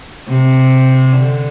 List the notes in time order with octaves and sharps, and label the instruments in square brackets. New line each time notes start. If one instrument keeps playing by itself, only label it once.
[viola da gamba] C3
D3